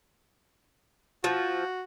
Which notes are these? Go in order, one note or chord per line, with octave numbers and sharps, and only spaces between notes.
F3 F#4